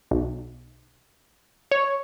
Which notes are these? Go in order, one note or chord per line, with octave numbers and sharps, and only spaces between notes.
B1
C#5